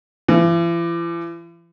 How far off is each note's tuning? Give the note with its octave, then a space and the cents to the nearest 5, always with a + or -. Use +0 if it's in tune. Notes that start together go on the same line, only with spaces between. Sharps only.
E3 +45